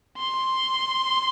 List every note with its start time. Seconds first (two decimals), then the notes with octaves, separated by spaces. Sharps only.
0.18 C6